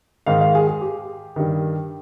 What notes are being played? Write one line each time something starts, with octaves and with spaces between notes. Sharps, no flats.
G#2 D#3 F5
F5
G#4
G#4
G4
G2 D#3